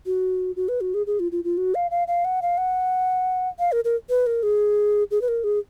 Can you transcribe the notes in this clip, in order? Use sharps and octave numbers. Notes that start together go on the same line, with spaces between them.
F#4
F#4
B4
F#4
G#4
G#4
F4
F4
F4
F#4
F5
F5
F5
F#5
F5
F#5
F5
A#4
A#4
B4
A#4
G#4
G#4
B4
A#4
G#4